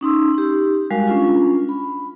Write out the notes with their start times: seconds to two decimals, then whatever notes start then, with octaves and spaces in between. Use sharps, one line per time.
0.01 C#4 D#4 C6 E6
0.34 D#4 G4
0.91 G3 G#3 F#4 A#4 F5 G#5
1.07 C#4 D4 F4
1.69 B5